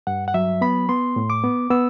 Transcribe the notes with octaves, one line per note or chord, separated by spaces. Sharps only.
G2 F#5
F#5
F#3 E5
B3 B5
B3 C6
A2
D6
B3
B3 E6